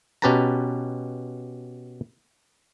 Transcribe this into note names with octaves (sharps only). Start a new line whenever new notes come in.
B2 C#4 G4 B4 A5 A#5